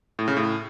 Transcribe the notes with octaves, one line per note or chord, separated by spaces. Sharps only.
A2
C#3
A2